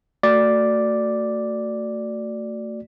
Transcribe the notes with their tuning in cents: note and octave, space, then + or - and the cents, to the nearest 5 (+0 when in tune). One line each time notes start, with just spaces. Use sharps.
A3 +30 F#4 +0 D5 +0